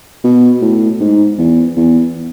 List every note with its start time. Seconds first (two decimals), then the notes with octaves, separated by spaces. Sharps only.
0.24 B2
0.62 A2
1.00 G#2
1.38 E2
1.76 E2